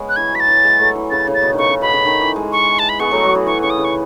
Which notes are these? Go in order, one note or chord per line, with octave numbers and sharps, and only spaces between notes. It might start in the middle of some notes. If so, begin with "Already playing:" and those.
Already playing: G#3 B3 C#4
F#6
E3 G#6
F#3 B6
A6
E3
G#3
F#3 A3
E3
C#3 A6
C#3
A6
B2
D#3
C#3 C#6
C#3
B2 B5
C#3
D#3
E3
G#3
C#6
A5
B5
G#3 B3 C#6
F#3 A3
F#3
E3
E3 C#6
C#3 C#6
D#6
C#3
C#6